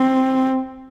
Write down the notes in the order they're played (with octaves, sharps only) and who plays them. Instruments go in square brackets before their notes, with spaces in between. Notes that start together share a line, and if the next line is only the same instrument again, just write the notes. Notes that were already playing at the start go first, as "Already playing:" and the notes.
Already playing: [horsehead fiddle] C4